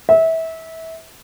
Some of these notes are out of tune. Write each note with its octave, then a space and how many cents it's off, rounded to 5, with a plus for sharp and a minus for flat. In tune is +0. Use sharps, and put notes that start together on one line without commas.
E5 -25